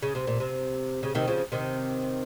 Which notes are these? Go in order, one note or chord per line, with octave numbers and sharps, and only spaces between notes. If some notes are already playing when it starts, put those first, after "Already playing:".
C#3
C3
A#2
C3
C#3
C3 D#3
C#3 F3
C3 D#3